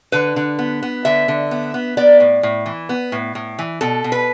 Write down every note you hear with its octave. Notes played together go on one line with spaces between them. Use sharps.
D3 B4
D3
B3
B3
D3 E5
D3
B3
B3
B3 D5
A2
A2
E3
B3
A2
A2
E3
B2 A4
B2
B4